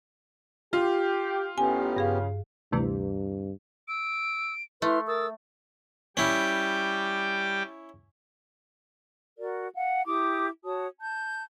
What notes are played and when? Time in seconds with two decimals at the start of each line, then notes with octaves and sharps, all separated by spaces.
0.73 F4 G4
1.58 A1 B3 C#4 G4 G#5
1.96 G2 C#3 G#4 F5
2.72 D2 G2 C3 E3
3.88 E6 D7
4.82 A3 E4 B4 C6 F6
5.08 A#4 D#6 E6 A6
6.17 G3 C#4 E4 G5 D6
9.39 F#4 A#4 D5
9.76 F5 F#5
10.06 E4 G4 D6 D#6
10.64 F#4 C#5 A5 D#6
11.00 A5 G6